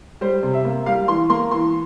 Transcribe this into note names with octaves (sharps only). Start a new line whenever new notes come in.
G3 C5
C3
E5
A#3
G3 F5
E3 C6
A#3 C6
E3 C6